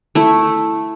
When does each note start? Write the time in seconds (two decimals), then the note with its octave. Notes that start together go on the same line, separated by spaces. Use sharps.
0.15 A3 E4